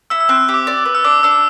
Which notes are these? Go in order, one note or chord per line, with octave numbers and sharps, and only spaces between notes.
E4 E6
E6
C4 F#6
G4
D6
D5
B4
E6
D4 D6
D4 E6